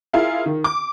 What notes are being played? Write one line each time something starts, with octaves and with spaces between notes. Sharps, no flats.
E4 F4 G#4 A#4 F5
D#3
D6